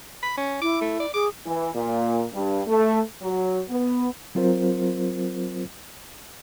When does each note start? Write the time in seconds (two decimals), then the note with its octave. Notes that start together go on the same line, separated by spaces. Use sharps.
0.23 B5
0.37 C#4
0.62 E4 D6
0.81 A3
1.00 D5
1.14 G#4 D6
1.46 E3
1.74 A#2
2.33 G2
2.67 A3
3.21 F#3
3.69 B3
4.35 F#3 C4 F4 A#4 C5